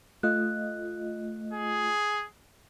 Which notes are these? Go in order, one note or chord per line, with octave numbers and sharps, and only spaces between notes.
A3 F4 D#5 F#6
G#4